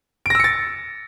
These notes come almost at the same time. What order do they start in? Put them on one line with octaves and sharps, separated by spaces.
D7 A#6 E6 C#7 A6